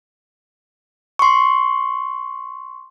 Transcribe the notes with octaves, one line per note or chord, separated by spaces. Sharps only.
C6 C#6